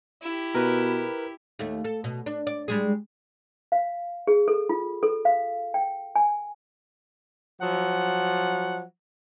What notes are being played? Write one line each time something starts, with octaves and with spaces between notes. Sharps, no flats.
E4 G4
B2 A#4 B4
D#2 A3
A4
B2
D4
D5
G3 G#3 G#4
F5
G#4
A4
F4
A4
F5
G5
G#5
F3 F#3 F#5